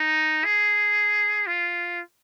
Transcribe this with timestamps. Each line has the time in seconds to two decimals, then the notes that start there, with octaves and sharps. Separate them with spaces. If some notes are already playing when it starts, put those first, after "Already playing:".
Already playing: D#4
0.45 G#4
1.47 F4